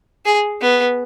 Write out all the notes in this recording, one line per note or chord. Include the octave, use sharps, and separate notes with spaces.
G#4
B3